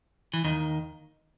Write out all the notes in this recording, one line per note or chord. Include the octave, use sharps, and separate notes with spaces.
E3
D#2 D#3